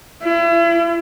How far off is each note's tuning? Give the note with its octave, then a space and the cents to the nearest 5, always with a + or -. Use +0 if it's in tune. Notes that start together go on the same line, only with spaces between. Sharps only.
E4 +40